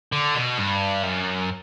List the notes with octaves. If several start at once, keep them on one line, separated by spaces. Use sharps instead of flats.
D3
B2
G2
F#2